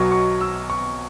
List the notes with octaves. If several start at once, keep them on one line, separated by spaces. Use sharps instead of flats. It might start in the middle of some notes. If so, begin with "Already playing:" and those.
Already playing: B1 B2 F#3 C#6
C#6
E6
C#6